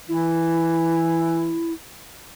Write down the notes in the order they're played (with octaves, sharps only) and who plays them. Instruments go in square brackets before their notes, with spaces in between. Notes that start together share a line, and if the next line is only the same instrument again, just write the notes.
[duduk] E3 [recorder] E4